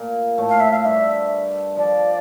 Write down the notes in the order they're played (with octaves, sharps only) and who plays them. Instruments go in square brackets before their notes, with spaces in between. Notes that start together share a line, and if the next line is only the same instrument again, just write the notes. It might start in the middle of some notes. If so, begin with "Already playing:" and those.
Already playing: [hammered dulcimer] A#2 A#3
A2 A3
[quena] F5
E5
F5
[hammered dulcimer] G2 G3 [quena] E5
[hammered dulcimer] F3 [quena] D5